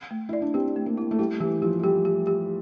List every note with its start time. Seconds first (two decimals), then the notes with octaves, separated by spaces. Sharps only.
0.11 A3
0.29 E4 D5
0.42 D4
0.54 C4 G4
0.76 A3
0.86 A#3
0.97 E4
1.11 A3
1.19 G3 E4
1.40 E3 G4
1.62 F3 G4
1.80 A3
1.83 G3 G4
2.05 G4
2.27 G4